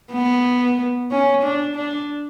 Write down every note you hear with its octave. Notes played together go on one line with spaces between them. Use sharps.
B3
C#4
D4
D4